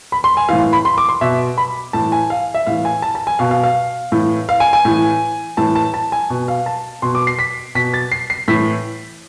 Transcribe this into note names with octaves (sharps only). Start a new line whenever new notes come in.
B5
C6
G#5
A2 E3 F5
B5
C6
D6
C6
B2 E5
B5
A2 E3 A5
G#5
F5
E5
A2 E3 F5
G#5
A5
A5
G#5
B2 F5
F5
F5
A2 E3
F5
G#5
G#5
A2 E3
A2 E3 A5
A5
A5
G#5
B2
F5
A5
B2 C6
D6
C7
B6
B2 B6
A6
C7
C7
A2 E3 B6